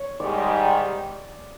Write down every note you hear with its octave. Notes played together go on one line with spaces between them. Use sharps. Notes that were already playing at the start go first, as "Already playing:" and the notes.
Already playing: C#5
G#2 D#3 G3 D5